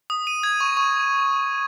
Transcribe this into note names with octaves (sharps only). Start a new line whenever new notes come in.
D#6
D#7
G#6
C#6
C#6